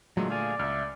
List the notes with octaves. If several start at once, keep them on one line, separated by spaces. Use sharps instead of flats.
A#2 D3 F#3 G#3 A3
G#4 D5 F5 G#5
C#2 E5 E6 F6